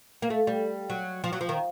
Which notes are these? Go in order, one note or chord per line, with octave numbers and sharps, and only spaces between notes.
A#3
A3
G3
F#3
F3
F#3
F3
D#3